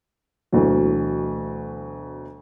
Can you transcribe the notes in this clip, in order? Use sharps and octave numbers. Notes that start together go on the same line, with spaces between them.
D2 B2 E3 F#3